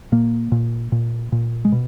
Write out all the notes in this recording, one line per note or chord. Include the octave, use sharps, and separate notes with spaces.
A#2 A#3
A#2
A#2
A#2
G#3
B2